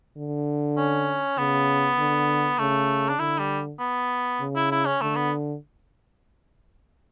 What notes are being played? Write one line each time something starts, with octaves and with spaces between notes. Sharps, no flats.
D3
C#4
C#3 B3
D3
C#3 A3
D4
D3 E4
G3
B3
C#3
E4
E4
C#4
D3 A3
B3